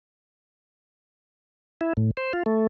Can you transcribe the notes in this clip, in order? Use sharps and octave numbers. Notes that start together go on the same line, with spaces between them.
E4
A2
C5
F4
A3